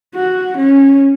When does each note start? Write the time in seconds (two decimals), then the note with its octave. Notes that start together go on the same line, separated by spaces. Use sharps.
0.15 F#4
0.57 C#4